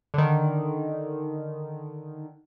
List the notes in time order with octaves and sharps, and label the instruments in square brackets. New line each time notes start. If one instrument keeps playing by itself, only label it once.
[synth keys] D3 D#3